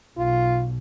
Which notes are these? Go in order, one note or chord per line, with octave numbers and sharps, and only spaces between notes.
B1 F4